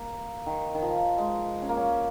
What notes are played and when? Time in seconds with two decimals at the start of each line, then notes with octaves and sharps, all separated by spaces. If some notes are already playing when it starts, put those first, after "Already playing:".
Already playing: A#3
0.46 D#3
0.75 D#3
0.82 F3
1.18 G#3
1.62 C#4
1.69 A#3
1.77 C#4